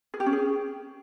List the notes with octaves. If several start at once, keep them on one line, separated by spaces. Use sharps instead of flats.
G#4
G4
C#4
G#4